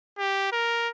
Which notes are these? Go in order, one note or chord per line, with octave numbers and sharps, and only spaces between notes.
G4
A#4